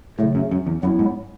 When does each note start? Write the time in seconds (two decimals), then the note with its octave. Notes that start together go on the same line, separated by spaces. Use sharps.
0.19 A2 C#3 F#3 A3
0.35 F#2
0.51 F#2
0.67 E2
0.83 F#2 F#3 B3 E4
0.99 G#2